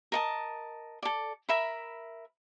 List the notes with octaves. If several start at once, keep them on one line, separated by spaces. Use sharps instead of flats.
A#4 D#5 A5
A4 D5
A#4 E5 B5